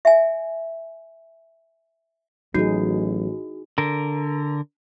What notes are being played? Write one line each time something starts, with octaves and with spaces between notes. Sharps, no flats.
E5 G#5
A1 F#3 D#4 E4 F#4 G#4
D3 A#4